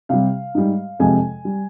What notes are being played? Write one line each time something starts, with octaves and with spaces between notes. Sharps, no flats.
C3 G3 F5
G#2 G3
F2 C3 F3 G#3 G#5
G3